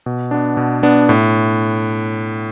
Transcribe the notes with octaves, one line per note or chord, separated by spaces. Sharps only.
B2
B3 D4
B2
B3 D4
A2